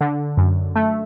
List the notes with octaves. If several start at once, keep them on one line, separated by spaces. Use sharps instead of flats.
D3
F#2
A3